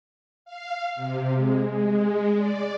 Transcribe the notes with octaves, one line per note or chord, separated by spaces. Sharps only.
F5
C3
G#3
G#3
D5